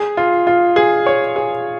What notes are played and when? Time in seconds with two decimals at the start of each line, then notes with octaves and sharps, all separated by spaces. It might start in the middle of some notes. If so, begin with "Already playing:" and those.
Already playing: G#4
0.17 F4
0.47 F4
0.76 G#4
1.07 C#5
1.36 G#4